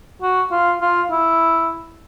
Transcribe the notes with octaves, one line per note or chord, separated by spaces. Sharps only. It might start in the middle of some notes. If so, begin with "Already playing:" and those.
F#4
F4
F4
E4